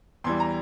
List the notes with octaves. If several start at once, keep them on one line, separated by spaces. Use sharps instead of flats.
E2 E3 G3 C6
A#5